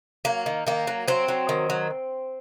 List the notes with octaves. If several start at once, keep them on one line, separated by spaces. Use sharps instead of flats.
F#3 A#3
D#3
D#3 A#3
F#3
F#3 C4
F#3
D#3
F#3